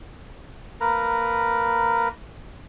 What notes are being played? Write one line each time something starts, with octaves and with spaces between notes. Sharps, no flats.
A#3 A#4 B4 A#5